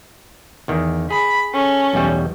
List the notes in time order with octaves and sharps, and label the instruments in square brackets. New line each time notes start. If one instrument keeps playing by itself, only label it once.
[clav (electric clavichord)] E2 D#3
[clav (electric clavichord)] G#4 [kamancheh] B5
[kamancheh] C#4 A4
[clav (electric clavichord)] B1 E2 G3